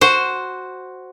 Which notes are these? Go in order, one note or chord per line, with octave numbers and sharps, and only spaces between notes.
F#4 C5